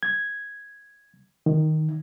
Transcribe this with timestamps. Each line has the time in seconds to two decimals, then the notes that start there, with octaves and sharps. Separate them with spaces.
0.03 G#6
1.46 D#3